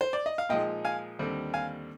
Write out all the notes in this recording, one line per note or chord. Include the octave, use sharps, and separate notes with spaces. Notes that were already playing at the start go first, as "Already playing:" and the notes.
C5
D5
D#5
F5
A#2 F3 G#3 D#4 D#5 G5
F5 G#5
D#2 D3 G3 C4
F5 G#5